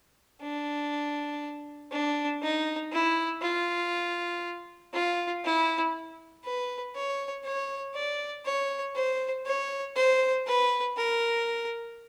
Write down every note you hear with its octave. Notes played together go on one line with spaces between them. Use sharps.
D4
D4
D#4
E4
F4
F4
E4
B4
C#5
C#5
D5
C#5
C5
C#5
C5
B4
A#4